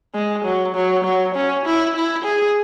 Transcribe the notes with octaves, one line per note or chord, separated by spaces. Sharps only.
G#3
F#3
F#3
F#3
C#4
E4
E4
G#4